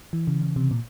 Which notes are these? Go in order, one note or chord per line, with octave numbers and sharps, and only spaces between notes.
E3
C#3
C#3
C3
A#2